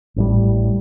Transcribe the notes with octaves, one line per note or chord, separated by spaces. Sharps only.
A1 A2 G3